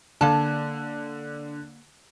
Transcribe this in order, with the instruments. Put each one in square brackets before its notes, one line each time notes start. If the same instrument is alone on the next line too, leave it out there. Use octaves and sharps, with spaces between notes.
[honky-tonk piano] D3 [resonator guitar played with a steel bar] A#3 A5